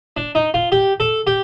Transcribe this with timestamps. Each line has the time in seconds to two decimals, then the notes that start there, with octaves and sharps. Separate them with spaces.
0.17 D4
0.35 D#4
0.54 F4
0.72 G4
1.00 A4
1.27 G4